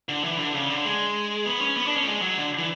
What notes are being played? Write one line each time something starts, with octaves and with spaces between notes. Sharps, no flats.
D3
E3
D3
C#3
D3
G#3
B3
C#4
B3
D4
C#4
A3
G#3
F#3
D3
E3